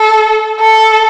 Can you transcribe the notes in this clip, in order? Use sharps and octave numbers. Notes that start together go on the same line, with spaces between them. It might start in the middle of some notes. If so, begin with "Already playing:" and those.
Already playing: A4
A4